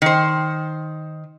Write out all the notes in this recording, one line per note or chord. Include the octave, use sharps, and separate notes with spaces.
D#3 C5